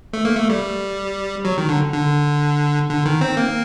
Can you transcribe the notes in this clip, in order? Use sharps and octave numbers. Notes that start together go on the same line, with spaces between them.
A3
A#3
A3
G3
F#3
D#3
D3
D3
D3
D#3
C4
A#3